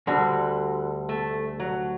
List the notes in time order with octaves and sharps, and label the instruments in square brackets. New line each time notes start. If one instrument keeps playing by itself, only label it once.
[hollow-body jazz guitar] D2 D3 G3 [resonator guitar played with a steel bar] F#4
[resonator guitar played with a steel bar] A3
F#3